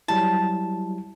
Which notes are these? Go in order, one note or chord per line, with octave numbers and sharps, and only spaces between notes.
F#3 G3 E4 A5